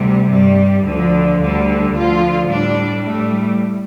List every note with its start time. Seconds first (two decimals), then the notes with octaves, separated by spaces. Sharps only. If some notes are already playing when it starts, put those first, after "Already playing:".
Already playing: D2 C3 G3
0.29 G2 G3
0.84 D2 D3 F3
1.40 D2 D3 G3
1.95 D2 D3 F3 F4
2.50 A2 G3 D4
3.05 A2 G3 A3